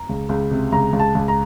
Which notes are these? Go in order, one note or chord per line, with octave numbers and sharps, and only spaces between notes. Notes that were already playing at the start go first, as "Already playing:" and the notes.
Already playing: A#5
C#2
C#2
C3
C#2 A#5
C#2
A5
C#2
A#5